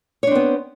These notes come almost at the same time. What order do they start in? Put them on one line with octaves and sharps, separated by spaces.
C#5 D4 C4 B3